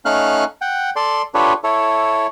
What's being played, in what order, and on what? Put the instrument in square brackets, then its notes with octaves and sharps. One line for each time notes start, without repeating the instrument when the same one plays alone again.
[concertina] A3 C#4 D#4 F5 F6 F#6
F#5 G5
A4 D5 C6
D4 F4 G4 A4 B4 C#5
E4 A4 C#5